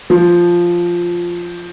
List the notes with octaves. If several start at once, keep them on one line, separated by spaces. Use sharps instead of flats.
F3